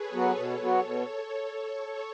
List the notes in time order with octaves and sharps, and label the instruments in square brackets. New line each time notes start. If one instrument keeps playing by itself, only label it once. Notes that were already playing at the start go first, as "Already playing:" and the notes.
Already playing: [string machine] G#4 A4 B4 C#5
[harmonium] F#3 B3 F#4
[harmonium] B2 [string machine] A4 C#5
[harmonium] F#3 B3 F#4
B2